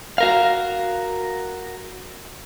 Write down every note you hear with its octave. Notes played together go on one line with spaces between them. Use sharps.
F#4 A#4 F5